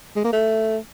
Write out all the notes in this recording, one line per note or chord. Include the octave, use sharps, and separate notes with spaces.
G#3
A#3
A3